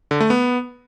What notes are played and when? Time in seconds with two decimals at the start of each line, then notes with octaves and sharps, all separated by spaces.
0.11 D3
0.20 A3
0.30 B3